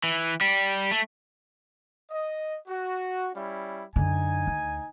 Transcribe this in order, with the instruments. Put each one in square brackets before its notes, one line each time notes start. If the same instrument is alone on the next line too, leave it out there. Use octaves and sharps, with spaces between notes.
[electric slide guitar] E3
G3
A3
[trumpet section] D#5
F#4
G3 C#4 E4
[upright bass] F#2 D3 [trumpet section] D#4 G#5
[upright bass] D2